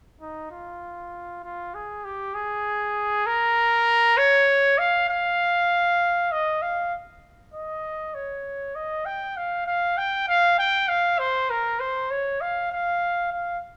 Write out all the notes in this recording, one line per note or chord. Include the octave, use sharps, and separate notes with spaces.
D#4
F4
F4
G#4
G4
G#4
A#4
C#5
F5
F5
D#5
F5
D#5
C#5
D#5
G5
F5
F5
G5
F5
G5
F5
C5
A#4
C5
C#5
F5
F5
F5